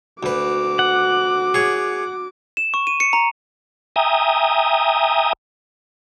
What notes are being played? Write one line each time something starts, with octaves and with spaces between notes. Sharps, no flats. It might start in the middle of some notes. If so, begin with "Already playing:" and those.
D2 F#4 B4 D6
F#5
G#4 C#5
E7
C#6
D#7
C#7
A#5
E5 G5 G#5 A#5 D#6